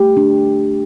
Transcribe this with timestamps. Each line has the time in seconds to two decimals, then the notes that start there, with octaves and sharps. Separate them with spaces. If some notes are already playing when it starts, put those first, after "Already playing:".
Already playing: A3 G4
0.17 D4